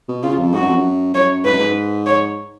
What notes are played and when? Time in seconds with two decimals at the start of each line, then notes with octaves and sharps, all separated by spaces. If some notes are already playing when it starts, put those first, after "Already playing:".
0.08 B2
0.23 C#3 F4
0.39 F2
0.53 G#2 F#4
0.60 F#2
0.68 F2
0.76 F#2
1.14 F#2 C#5
1.45 G#2 B4
1.53 F#2
1.60 G#2
2.06 C#5